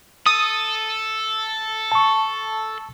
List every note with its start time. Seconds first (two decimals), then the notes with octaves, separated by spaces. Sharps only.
0.26 A4 D#6
1.92 A5 C#6